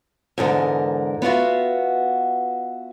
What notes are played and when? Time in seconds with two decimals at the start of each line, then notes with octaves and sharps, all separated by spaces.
0.38 E2 G#2 D3 A#4
1.22 B3 F4 F#4 E5